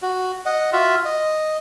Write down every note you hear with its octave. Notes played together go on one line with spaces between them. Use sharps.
F#4
D#5 F#5
F4 F#4 E5
D#5